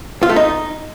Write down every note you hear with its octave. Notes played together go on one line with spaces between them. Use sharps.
F4
A3
D#4